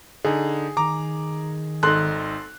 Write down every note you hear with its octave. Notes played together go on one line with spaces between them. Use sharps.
D3 D#4 G#4
D#3 A#5 D6
G#1 D#4 A4 C6 F#6